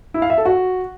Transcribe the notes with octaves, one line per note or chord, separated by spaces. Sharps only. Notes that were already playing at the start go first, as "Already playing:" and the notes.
E4
F5
E5
A4
F#4